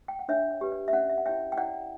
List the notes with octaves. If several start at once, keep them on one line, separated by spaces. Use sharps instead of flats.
G5
F#5
D4 C#5 E5
D5
G4 B4
D5
E5
C#4 D5 F#5
E5
F#5
E4 G4 C#5 E5 G5
G5
E4 D5 F#5